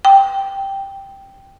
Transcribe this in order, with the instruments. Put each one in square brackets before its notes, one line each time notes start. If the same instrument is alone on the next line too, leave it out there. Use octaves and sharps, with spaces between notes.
[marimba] G5